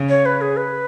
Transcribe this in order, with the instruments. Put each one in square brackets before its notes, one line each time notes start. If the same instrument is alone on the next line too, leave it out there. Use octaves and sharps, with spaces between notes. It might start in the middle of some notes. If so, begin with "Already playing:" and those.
Already playing: [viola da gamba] C#3
[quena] C#5
B4
G#4
B4